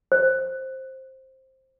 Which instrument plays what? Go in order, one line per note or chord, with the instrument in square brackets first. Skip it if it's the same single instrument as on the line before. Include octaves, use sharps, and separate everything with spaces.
[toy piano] C5